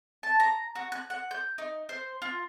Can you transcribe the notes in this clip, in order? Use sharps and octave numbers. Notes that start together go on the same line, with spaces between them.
A5
A#5
F#4
F#6
F#5
G6
D#4
C5
F4